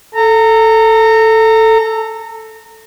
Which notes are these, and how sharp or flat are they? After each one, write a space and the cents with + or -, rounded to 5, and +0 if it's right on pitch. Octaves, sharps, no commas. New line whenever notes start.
A4 +0 A#5 -25